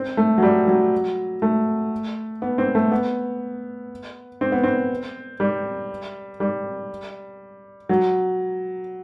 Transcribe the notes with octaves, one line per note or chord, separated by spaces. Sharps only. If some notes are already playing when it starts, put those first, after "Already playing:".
Already playing: C4
A3
F#3
G3
F#3
A3
B3
C4
A3
B3
C4
B3
C4
G3
G3
F#3